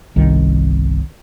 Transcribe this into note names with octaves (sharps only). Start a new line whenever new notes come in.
G1 C2 D#3